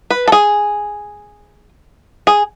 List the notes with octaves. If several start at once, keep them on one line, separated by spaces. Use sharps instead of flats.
B4
A4
G#4
G#4